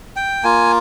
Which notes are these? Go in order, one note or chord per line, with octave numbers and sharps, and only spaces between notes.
G5
A#3 F4 G#5